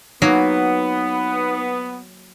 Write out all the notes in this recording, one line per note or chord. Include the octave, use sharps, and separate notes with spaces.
F#3 A#3 B3 D#4